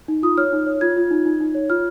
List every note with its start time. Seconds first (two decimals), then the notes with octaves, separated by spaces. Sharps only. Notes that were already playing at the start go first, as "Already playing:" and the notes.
0.08 D#4
0.23 F4 D#6
0.38 C#5 F6
0.53 D#4
0.67 C#5
0.81 F4 G#6
0.97 F4
1.11 D#4
1.26 D#4
1.40 D#4
1.55 C#5
1.70 F4 F6